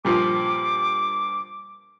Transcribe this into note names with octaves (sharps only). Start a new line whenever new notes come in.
G2 A#2 F3 D6